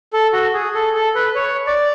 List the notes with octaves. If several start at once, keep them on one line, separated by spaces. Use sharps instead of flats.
A4
F#4
G#4
A4
A4
B4
C#5
D5